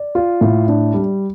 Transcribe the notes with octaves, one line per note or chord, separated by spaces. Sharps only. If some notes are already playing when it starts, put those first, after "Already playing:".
Already playing: D5
F4
A2
D4
G3